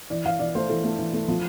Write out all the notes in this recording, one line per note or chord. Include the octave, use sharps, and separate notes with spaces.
E3 D5
E3 F5
E3 D5
A3 C5
E3 A4
A3
E3
A3
F3